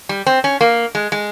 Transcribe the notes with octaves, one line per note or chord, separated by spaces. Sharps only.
G3
C4
C#4
A#3
G#3
G#3